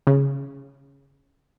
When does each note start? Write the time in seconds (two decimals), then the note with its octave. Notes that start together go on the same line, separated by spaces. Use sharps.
0.07 C#3